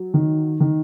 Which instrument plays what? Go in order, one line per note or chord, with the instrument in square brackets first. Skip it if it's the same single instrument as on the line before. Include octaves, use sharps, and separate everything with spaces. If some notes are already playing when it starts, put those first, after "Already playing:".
Already playing: [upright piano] F#3
D#3
D#3